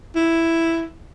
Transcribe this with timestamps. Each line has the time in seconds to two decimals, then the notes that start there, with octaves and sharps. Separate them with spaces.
0.15 E4